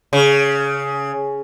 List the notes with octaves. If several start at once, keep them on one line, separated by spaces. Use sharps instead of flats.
C#3